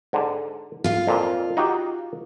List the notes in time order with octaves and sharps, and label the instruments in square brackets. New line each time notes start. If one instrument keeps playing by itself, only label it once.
[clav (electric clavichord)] G#2 D3
[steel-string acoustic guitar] F4 F5
[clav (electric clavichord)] F2 A#2
D#4 F#4 G4